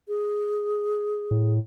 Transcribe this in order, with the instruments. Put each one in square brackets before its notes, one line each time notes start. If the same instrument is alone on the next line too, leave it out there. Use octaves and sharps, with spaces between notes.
[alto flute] G#4
[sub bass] A2